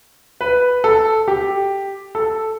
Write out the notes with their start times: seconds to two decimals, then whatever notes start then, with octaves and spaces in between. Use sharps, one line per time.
0.41 B4
0.84 A4
1.28 G4
2.15 A4